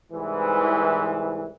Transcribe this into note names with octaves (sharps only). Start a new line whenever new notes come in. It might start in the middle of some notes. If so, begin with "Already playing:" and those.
C2 G#2 E3